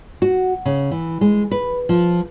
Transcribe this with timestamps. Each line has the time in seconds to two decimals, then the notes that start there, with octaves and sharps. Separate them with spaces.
0.22 F#4
0.66 C#3
0.91 E3
1.21 G#3
1.51 B4
1.89 F3